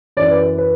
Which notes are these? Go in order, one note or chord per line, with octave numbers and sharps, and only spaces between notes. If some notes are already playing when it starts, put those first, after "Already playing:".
F#2 E3 D5
B4
B4